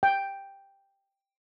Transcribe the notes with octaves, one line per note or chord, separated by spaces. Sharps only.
G5